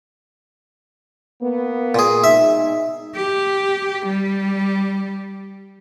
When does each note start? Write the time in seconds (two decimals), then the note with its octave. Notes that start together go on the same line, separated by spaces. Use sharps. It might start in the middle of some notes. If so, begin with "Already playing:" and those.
1.42 A#3 B3
1.95 A#2 G#4
2.24 B2 G#3 D#4 E5
3.15 G4
4.07 G3